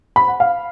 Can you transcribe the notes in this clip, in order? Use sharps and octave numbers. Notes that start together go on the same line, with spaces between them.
B5
F#5
F5